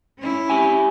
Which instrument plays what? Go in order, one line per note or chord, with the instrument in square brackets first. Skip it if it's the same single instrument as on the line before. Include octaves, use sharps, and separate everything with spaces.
[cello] C#4 E4
[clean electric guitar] G4 E5 G#5